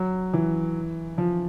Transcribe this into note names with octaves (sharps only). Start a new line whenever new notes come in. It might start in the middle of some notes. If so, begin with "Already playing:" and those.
Already playing: F#3
E3
F3